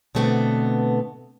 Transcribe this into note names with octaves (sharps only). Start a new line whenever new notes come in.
B2 D3 A3 B3 C4